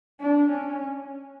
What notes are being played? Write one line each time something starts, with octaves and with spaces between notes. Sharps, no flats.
D4
C#4